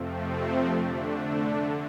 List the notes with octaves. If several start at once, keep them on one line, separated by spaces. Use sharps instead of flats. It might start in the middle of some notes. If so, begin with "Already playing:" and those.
Already playing: F2 C3 F3 A3 C4
D3 A3 D4
D3